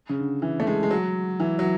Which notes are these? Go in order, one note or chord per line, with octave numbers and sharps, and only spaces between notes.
C#3
D3
E3
A3
G#3
G#3
F#3
E3
F#3